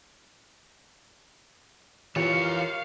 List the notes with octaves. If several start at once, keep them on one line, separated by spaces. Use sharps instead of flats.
E3 F4 G4 A#4 C#5 F5 C#7